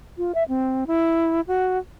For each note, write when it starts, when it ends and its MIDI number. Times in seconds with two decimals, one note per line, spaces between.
0.18 0.32 65
0.35 0.43 76
0.49 0.84 60
0.87 1.41 64
1.48 1.78 66